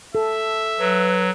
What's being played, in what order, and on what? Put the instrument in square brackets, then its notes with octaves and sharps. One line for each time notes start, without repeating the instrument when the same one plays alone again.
[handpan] A4 [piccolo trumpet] E5
[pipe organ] F#3 [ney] B4